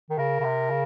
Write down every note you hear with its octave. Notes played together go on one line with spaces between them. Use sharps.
D#3
C#3 A#4
C#3
C3
C#3